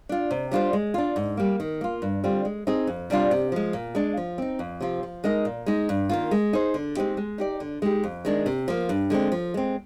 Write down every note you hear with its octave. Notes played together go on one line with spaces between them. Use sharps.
D4 F4
C3
G3 D4 F4 C5
G#3
D4 F4
G#2
G3 A#3
D#3
A#3 F4
G2
D3 G3 C4 F4
G#3
C4 D#4 G#4
F2
C3 G3 D4 F4
C3
F3 G#3
A#2
G#3 D4
F3
C4 D#4
F2
C3 F3 C4 F4
F3
G#3 D#4 A#4 D#5
A#2
G#3 D#4
G2
D#3 A#3 F4
G#3
D#4 G#4 C5
D3
G#3 C4 D#4 G4
G#3
D#4 G4 D5
D3
G#3 D#4 G4
F2
D#3 G#3 D4
C3
F3 A#3
G2
D3 G#3 C4
F3
G#3 C4